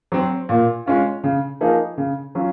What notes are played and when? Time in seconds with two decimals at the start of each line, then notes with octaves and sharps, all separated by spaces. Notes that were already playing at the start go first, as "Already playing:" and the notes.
0.12 F#3 C4
0.49 A#2
0.86 G#3 C#4 F4
1.24 C#3
1.61 F3 A#3 D#4 G#4
1.98 C#3
2.35 F#3 C#4 F4